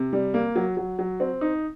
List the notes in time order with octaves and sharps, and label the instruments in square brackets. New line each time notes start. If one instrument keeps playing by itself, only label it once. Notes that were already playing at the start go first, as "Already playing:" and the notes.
Already playing: [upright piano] C3
G3
A#3
F#3
F#3
F#3
C4
D#4